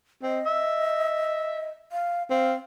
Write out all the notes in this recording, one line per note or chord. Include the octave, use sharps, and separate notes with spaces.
C4 D#5
E5
F5
C4 F5